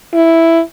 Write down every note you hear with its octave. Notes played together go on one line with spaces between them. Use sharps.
E4